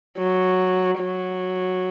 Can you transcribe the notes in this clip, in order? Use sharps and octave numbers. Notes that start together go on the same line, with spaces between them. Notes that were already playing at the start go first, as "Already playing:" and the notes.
F#3
F#3